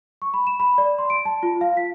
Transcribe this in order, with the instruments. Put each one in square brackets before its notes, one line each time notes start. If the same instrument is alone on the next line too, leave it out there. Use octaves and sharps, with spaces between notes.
[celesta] C#6
B5
E7
B5
D5
C6
D7
A5
F4
F5
B6